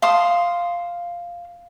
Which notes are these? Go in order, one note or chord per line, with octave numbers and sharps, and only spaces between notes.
F5 A5 C6 D#6